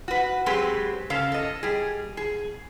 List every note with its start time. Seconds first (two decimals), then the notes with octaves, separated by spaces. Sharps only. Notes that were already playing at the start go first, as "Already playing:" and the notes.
0.08 F#4 B4
0.46 F#3 G#3 C4 G4 G#4 B4
1.10 C#3 C#4 A4 F5
1.32 A4 D#5
1.63 G3 G#4
2.17 G#4